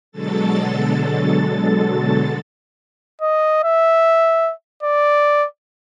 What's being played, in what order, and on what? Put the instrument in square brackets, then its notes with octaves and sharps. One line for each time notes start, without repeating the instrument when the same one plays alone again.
[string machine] B2 D3 F#3 G#3 A4 A6
[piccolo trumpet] D#5
E5
D5